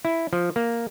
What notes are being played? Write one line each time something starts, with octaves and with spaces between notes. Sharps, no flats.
E4
F3
A#3